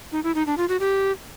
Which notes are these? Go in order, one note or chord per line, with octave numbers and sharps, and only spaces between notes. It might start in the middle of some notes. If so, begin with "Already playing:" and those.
D#4
E4
D#4
D4
F4
F#4
G4